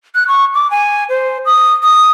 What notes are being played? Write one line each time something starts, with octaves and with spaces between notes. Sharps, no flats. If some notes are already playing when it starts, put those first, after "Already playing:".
F#6
C#6
D6
G#5
C5
D#6
D#6